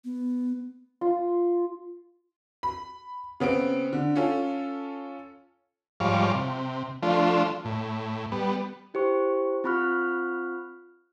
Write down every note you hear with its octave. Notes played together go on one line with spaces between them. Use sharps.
B3
F4
B5
C#3 B3 C4 D7
D3
C#4 F4 A4
G#2 F3 G3 C#5 F5 D6
C3
F3 A3 D4 F4
A2
G3 B3
E4 G4 C5 C#6
C4 F4 B5 C#6 F6 F#6